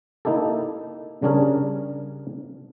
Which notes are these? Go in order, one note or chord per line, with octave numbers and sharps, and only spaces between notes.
A#3 D#4 E4 G4 A4
C#3 G3 C#4 D4 G#4 A#4